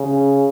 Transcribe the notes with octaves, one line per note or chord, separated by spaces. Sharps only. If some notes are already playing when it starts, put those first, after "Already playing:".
Already playing: C#3